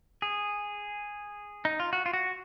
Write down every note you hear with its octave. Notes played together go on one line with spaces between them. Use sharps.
G#4
D#4
F4
F#4
F4
F#4